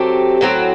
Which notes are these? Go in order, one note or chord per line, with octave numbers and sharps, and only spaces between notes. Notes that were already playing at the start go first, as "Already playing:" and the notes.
Already playing: F#3 A3 C4 G4
A2 F#3 C4